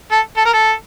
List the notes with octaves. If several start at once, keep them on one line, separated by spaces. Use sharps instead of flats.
A4
A4
A#4
A4